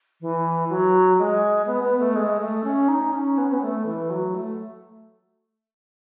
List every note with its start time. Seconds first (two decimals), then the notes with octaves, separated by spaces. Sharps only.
0.21 E3
0.70 F#3
1.19 G#3
1.67 B3
1.84 B3
1.99 A3
2.16 G#3
2.40 A3
2.64 C#4
2.88 D#4
3.13 C#4
3.38 B3
3.45 C#4
3.53 B3
3.62 A3
3.86 E3
4.10 F#3
4.35 A3